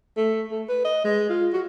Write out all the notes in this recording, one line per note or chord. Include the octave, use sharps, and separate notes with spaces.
A3
A3
B4
D#5
G#3
F4
F#4